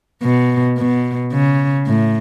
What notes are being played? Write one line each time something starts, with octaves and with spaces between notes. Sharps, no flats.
B2
B2
C#3
A2